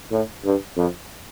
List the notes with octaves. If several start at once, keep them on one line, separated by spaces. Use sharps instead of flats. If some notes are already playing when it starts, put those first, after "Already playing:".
A2
G2
F2